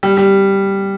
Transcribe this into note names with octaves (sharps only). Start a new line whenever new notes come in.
G3
G3